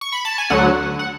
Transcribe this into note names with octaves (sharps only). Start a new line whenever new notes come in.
C#6
B5
A5
G#5
D2 D3 F#3 F#5
F#5